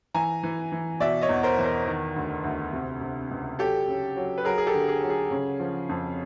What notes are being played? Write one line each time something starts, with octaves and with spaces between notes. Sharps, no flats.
E3 G#5 A#5
E3
E3
B2 D5 E5
C#5 D#5
E2
A#4 C5
E2
A#4 C5
D#3
D2
D2
C3
C3
C#2
F#3 G4 A4
C#3
F#3
B4
F#3 G#4 A#4
G#4
G4 A4
D3
G#4
F#3
G#4
C#3
F3
F2